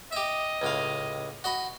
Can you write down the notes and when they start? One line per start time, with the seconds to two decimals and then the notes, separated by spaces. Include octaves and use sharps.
0.12 G4 D#5 E5
0.62 C#2 A2 F5
1.44 F#4 D#5 B5